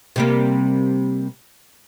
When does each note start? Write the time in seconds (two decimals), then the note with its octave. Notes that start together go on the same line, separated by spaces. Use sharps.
0.16 C3 G3 A#3